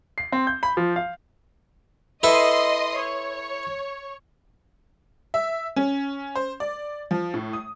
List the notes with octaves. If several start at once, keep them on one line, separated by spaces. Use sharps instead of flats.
C7
C4
G6
B5
F3
F5
E4 A4 B4 D#5 C6 D#6
C#5
E5
C#4
C5
D5
F3
A2
D#6